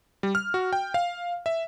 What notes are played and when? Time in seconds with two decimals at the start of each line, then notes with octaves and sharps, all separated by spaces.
0.23 G3
0.35 F6
0.54 F#4
0.73 G5
0.94 F5
1.46 E5